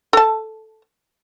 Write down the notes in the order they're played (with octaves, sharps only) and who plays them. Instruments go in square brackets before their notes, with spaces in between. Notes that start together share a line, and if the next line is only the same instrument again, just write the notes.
[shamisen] A4 A5